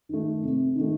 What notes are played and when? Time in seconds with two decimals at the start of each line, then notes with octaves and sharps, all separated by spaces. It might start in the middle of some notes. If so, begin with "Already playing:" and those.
0.09 D#3 A3
0.43 C3
0.75 D#3
0.81 A3